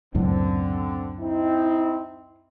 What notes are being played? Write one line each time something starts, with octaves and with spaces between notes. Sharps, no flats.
C#2 F#2 A2 D3 C4
C4 D#4 E4